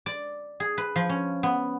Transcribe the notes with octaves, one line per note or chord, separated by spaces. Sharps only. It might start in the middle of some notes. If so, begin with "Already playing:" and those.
D5
G#4
B4
F3
C#4
B3